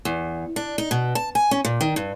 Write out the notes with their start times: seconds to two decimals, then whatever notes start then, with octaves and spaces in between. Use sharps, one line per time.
0.05 E2
0.56 D4
0.78 D#4
0.91 B2
1.15 A5
1.35 G#5
1.51 C#4
1.65 A#2
1.81 D#3
1.96 G2